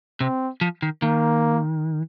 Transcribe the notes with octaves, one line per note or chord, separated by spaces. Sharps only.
C3 C4
F3
D#3
D#3 A#3